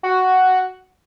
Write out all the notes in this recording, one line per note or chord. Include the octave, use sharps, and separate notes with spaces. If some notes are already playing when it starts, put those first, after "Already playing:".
F#4